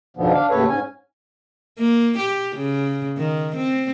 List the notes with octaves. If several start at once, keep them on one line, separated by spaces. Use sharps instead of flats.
F2 G#2 B2 D3 F3 B3
D4 F5
D#2 A2 C#3 A4 B4 C#5
G#2 C#4 G#5
A#3
G4
C#3
D#3
C4